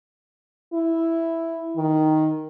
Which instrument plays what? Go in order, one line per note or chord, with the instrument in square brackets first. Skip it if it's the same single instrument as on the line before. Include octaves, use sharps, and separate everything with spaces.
[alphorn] E4
D#3